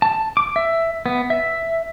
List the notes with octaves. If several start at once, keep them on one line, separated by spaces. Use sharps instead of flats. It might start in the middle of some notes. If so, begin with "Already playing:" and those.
A5
D6
E5
B3
E5